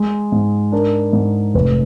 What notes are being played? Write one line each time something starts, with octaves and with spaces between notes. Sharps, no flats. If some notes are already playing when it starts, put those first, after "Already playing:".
Already playing: G#3
G#2
D4 A#4
G#2
F1 B4